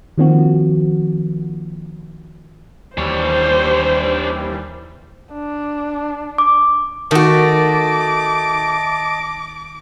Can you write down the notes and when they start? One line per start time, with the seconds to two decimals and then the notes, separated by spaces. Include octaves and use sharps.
0.18 D#3 F3 A#3 C4 F#4
2.98 D#2 E3 G3 D4 C5 C#5
5.33 D4
6.38 D6
7.11 D#3 A3 F#4 D#5 A5 D6